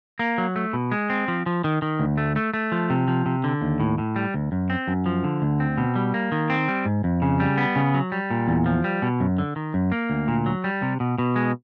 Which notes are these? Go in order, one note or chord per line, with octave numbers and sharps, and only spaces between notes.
A#3
F#3
A3
B2
G#3
C4
F3
F3
D#3
D#3
D2
A3
A3
A3
F3
C3
F3
C3
D3
D#2
A2
A2
G3
D2
F#2
C4
F#2
F3
D3
D2
C4
B2
G3
A#3
D#3
C4
G3
G#2
F2
C#3
G3
B3
C#3
F#3
G3
A#2
E2
F3
G3
B2
F#2
D3
D#3
F#2
A#3
D2
A#2
F#3
G3
C3
B2
B2
G#3